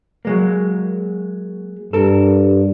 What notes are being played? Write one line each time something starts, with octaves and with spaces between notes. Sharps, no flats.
F#3 G#3 A#3
G2 A4 A#4